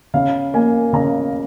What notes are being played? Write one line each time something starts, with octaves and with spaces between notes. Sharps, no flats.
C#3 F5
A#3 G#5
C#3 A#5